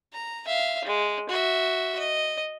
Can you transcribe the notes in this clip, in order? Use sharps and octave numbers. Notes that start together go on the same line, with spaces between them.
A#5
E5 F5
G#3
F#4 E5
D#5